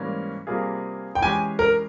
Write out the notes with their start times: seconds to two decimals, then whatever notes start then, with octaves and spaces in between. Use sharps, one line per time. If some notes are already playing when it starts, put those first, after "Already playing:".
Already playing: G#2 E3 G3 A#3 C#4
0.47 C3 G3 A#3 F4 G#4
1.15 G5
1.21 E3 G#3 C#4 E4 G4 G#5
1.59 A#4